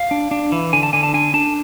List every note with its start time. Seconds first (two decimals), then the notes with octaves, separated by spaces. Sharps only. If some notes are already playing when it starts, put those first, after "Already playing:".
Already playing: F5
0.11 D4
0.31 D4
0.52 E3
0.73 D3 G#5
0.83 A5
0.93 D3 G#5
1.03 A5
1.14 D4 G#5
1.34 D4 A5